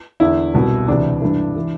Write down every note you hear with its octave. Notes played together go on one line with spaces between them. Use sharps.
E2 D3 E4
C2 B2
D2 C3 E3 D4
G2 E3
E3